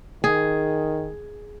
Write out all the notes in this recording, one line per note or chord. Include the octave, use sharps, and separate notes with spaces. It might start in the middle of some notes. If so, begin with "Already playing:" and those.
D#3 G#4